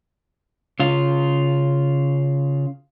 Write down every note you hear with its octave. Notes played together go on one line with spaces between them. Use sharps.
C#3 F4